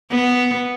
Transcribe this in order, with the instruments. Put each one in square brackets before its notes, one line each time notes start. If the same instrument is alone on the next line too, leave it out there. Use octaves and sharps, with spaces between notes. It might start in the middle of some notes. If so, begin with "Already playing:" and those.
[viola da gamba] B3